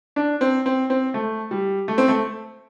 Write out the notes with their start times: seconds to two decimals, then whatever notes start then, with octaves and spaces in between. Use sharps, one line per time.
0.16 D4
0.41 C4
0.66 C4
0.90 C4
1.14 A3
1.51 G3
1.88 A3
1.98 C4
2.08 A3